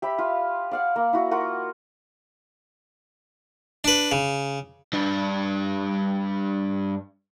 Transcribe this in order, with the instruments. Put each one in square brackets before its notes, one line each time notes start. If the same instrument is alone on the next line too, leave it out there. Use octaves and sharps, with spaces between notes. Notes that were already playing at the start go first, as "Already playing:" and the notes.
[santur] G4 E5 B5
F4 F5
D5 F5 F#5
A#3
E4 F#4
F4 F#4 A#4 F#5
[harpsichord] D4 B4
C#3
[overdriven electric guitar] G2 D4